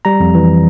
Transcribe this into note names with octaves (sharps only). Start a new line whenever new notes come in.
G3 A#5
F2
E3